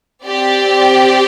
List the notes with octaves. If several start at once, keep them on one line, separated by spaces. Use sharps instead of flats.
C4 G4 D5